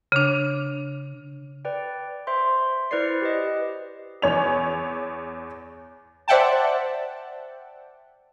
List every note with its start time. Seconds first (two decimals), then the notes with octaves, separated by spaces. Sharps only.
0.12 C#3 D4
1.65 B4 D5 G5
2.27 C5 E5 C6
2.91 E4 B4 C5 D5 C7
3.22 G4 B4 D#5
4.22 E2 C#5 F7
6.28 C5 D5 E5 F#5 G5 A5